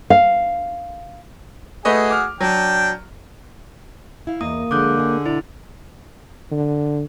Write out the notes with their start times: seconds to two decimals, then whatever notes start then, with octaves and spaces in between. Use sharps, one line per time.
0.10 F5
1.85 A3 F#4 G#4 B4 D#5
2.10 D6 F6
2.41 F#3 D4 G5
4.27 E4 F5
4.41 E2 A#3 D#5 D#6
4.71 D3 F3 G#3 D6 F#6 G6
4.97 G#4 D#5
5.26 B2 E4 D5
6.51 D3